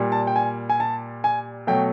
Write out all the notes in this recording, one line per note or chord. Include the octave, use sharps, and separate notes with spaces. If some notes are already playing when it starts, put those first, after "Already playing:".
Already playing: A#2 G3
A5
G5
G#5
G#5
A5
G#5
B2 F#3 A3 G5